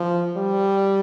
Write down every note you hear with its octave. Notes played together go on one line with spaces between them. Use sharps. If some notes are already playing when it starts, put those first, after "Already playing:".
Already playing: F3
G3